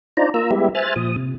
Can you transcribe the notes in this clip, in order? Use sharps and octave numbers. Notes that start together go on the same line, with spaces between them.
D4 D#4 F4 C5 D5 A#5
A#3 F4 A#5 E6
G3 G#3 B3 E4 G4 E5
C5 E5 G#5 F6 F#6 A6
A#2 F3 D#6
C3